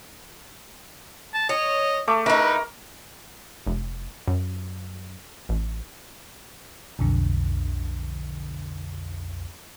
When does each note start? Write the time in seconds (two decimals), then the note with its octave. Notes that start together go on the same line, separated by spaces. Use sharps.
1.34 A5
1.49 C#5 D#5
2.08 A3 D6
2.26 D#4 E4 A#4 B4
3.67 F1
4.28 F#2
5.49 A1
6.99 B1 F2 D3